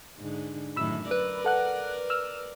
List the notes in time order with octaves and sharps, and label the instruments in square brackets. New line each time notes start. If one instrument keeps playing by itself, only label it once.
[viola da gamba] G#2 D3
[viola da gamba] F#2 A2 D#3 [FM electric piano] B5 E6
[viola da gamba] A#4 D5 [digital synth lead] B4
[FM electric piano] A4 F#5 F#6
E6 F6